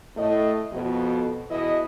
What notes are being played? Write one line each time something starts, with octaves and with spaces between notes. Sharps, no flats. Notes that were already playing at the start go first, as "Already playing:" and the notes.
A2 A3 D#5
F2 B2 F#4
E2 B2 E4 D#5